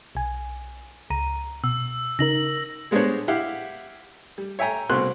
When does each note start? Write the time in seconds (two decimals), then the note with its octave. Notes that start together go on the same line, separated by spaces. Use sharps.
0.15 B1 G#5
1.10 C#2 A#5 D#7
1.64 B2 E6
2.19 C#3 D#4 A#4 A#6 F#7
2.91 G3 G#3 B3 D4 C5 C#5
3.28 E4 G4 F5 F#5
4.38 G3
4.59 C#5 E5 G5 G#5 A#5
4.89 C2 B2 C4 C6 F#6